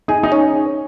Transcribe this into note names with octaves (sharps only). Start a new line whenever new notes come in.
D#4 G#4
D#4
C#4